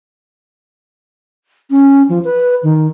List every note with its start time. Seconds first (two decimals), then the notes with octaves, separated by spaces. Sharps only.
1.71 C#4
2.09 F3
2.24 B4
2.63 D#3